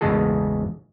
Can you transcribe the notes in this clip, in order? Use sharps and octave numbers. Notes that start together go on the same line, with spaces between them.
A1 E2 C#3 G#3 G#4 A4